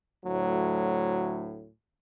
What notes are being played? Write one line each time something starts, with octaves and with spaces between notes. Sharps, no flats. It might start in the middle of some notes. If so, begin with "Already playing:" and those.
D2 A2 F#3